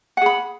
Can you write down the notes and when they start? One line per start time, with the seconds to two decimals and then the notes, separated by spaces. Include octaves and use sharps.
0.17 F#5
0.22 G#4
0.26 B5